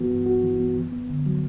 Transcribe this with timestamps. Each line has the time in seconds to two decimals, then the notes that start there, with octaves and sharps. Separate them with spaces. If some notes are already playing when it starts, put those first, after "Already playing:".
Already playing: G2 E3 B3 F#4
0.10 G2
0.26 F#4
0.43 E3
0.60 B3
0.75 F#2
0.92 B3
1.09 D3
1.26 F#3